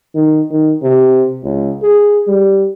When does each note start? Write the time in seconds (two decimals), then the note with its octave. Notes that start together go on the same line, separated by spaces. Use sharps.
0.15 D#3
0.51 D#3
0.82 C3
1.44 C#2
1.82 G#4
2.28 G3